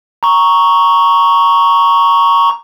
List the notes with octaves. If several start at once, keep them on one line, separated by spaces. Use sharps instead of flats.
A#5 C#6